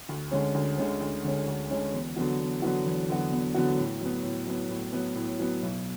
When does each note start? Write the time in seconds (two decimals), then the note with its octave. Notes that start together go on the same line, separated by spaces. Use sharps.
0.09 D2
0.31 D3 G#3 C#4
0.54 D2
0.78 D3 G#3 C#4
1.01 D2
1.24 D3 G#3 C#4
1.47 D2
1.70 D3 G#3 C#4
1.94 E2
2.16 D3 F#3 B3 F#4
2.39 E2
2.62 D3 F#3 B3 F#4
2.85 E2
3.09 D3 F#3 B3 F#4
3.32 E2
3.54 D3 F#3 B3 F#4
3.78 A2
4.01 F#3 B3
4.23 A2
4.47 F#3 B3
4.69 A2
4.93 F#3 B3
5.15 A2
5.39 F#3 B3
5.62 B1